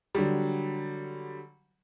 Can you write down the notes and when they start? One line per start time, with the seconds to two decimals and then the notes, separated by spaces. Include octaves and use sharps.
0.15 D3 F#3 G3